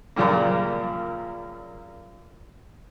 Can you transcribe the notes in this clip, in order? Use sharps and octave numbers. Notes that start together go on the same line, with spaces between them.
F#2 A#2 C#3 F3 G3 A#3